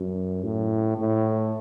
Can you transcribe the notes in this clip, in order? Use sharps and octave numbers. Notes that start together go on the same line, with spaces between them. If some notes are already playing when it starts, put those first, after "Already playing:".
Already playing: F#2
A2
A2